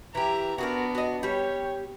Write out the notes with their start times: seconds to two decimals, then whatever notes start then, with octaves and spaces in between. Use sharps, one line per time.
0.15 E3 G4 E5 A#5
0.58 B3 D4 F#4 G#4 A#4
0.95 F#4 D#5
1.23 G3 G4 C#5